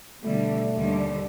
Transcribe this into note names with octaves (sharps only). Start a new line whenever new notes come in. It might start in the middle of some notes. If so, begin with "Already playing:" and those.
B2 D3 G3 A3
D#2 D3 G3